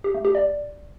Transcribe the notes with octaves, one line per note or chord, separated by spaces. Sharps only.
G4
A3
G4
D5